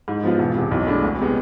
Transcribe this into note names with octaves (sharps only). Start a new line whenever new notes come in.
G#2
F3 B3 F4
E1
E2 C3
B1
A2 G#3 D4
D2
C3 G#3 B3